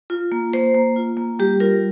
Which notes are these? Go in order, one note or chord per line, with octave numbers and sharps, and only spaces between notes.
F4
A#3
A#3 C5
A#3
F4
A#3
G3 G4
F4 A#4